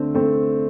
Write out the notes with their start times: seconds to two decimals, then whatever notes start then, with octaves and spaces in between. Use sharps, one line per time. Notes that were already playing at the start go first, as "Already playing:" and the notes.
Already playing: D3 A3 C4
0.15 A3 C4